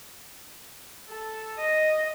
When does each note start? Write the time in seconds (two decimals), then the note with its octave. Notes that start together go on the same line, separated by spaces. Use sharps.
1.08 A4
1.58 D#5